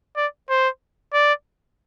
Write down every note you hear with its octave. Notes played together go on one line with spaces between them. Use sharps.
D5
C5
D5